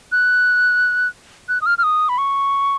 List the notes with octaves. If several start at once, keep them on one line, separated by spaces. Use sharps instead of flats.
F#6
F#6
D#6
F6
F6
D#6
B5
C#6